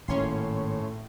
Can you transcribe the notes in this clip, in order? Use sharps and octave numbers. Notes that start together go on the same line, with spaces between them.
G#1 A2 A#3 C#4 C#5 C6